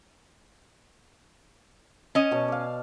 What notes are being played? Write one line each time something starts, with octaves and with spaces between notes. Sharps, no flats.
C#4 D#5
B2 C#5 A5
D5 F5